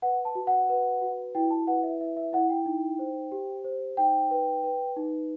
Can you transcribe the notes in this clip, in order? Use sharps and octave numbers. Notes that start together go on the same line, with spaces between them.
B4 F#5
A5
F#4
F#5
B4
F#4
E4 G5
A5
B4 F#5
E5
E4 E5
E5
E4 F#5
G5
D#4
C5
G4
C5
D#4 G5
B4
B4
D#4